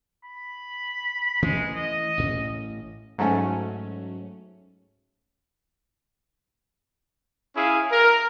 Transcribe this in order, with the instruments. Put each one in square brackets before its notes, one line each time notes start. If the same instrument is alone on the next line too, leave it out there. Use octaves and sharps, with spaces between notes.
[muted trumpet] B5
[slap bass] E3 A3 C#4 [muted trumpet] G#3
[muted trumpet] D#5
[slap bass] A1 A2 C#4
[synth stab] G#2 F#3 A3 C#4
[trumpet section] C#4 E4 G#4 F5
A#4